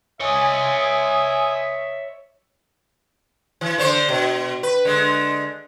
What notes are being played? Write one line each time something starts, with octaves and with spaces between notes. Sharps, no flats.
C#5 D#5 E5 G#5 D#6
E3
D3 D4 C5
B2
B4
D3 G#3